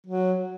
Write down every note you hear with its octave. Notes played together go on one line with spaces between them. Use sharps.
F#3